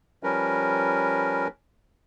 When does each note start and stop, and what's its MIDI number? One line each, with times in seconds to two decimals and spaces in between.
0.23 1.48 53
0.23 1.48 55
0.23 1.48 61
0.23 1.48 70
0.23 1.48 71